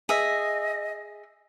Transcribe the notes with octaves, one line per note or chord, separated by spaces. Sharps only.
G#4 D#5 E5